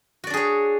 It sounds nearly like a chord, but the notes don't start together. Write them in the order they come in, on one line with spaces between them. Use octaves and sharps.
F#4 D5 D4 G#4 C#5